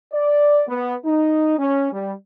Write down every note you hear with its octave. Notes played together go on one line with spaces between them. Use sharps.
D5
B3
D#4
C#4
G3